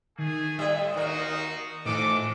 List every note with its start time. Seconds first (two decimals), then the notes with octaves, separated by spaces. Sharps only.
0.18 D#3 A3 G#4 G#5
0.59 A2 G3 E5 D#6
0.94 D#2 D#4 F4 F#4 A#4
1.85 F2 A2 D#3 E3 D4 A4 D6